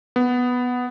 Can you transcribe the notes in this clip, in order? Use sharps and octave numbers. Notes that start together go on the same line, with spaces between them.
B3